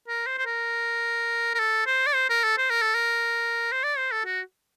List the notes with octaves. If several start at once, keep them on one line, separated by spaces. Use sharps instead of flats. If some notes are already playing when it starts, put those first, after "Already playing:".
A#4
C5
C5
A#4
A#4
A4
C5
D5
C5
A#4
A4
C5
A#4
A4
A#4
C5
D5
C5
A4
F#4